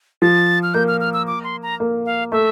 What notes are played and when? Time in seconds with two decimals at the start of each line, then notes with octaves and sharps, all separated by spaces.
0.22 F3 A6
0.63 F6
0.74 A#3 G6
0.88 F6
1.00 F6
1.13 E6
1.27 D6
1.44 C6
1.63 A#5
1.80 A#3
2.06 F5
2.32 A3 E5